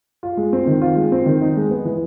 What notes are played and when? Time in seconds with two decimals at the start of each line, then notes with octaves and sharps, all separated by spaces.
0.23 F4
0.37 G#3
0.53 C4
0.67 D#3
0.82 F4
0.96 G#3
1.12 C4
1.26 D#3
1.42 D#4
1.57 G#3
1.71 B3
1.85 E3